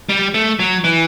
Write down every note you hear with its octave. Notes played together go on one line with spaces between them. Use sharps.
G3
A3
F#3
E3